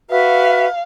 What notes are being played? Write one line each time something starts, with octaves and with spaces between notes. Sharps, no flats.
F#4 B4 E5 F5